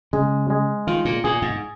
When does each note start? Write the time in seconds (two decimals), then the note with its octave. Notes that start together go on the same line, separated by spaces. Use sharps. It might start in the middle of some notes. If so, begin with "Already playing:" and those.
0.13 C#3 G#3
0.50 G#3
0.87 D#3 F4
1.05 A#2
1.24 A#2 G#4
1.42 G#2